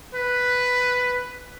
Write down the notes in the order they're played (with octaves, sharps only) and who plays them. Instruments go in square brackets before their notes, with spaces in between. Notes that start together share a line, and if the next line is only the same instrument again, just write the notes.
[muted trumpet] B4